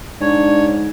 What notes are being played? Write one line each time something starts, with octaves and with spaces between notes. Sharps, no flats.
G#2 D4 C#5